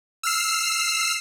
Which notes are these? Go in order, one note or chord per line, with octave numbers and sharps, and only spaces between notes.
E6 F6 C7